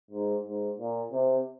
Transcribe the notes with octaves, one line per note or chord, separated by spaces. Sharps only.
G#2
G#2
A#2
C3